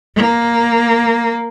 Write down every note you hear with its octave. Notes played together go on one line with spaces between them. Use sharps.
A#3